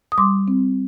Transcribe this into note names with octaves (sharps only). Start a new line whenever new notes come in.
D#6
G3 C6 D6
C4